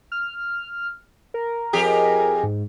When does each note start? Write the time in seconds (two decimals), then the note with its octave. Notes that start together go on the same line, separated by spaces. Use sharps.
0.12 F6
1.34 A#4
1.73 F2 G4 G#4
2.43 G#2